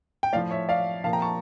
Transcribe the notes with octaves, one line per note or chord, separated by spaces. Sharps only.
G5
A2 F3 D5 F5
C#5 E5
D5 F5
A#2 F3 F5 A5
G5 A#5
A5 C#6